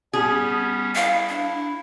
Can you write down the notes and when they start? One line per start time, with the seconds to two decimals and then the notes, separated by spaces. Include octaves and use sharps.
0.13 G3 B3 C#4 G#4
0.95 E4 F5
1.29 D4